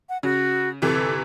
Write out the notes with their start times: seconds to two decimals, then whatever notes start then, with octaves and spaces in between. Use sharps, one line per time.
0.09 F#5
0.23 C#3 F#4
0.82 G1 C3 E3 A4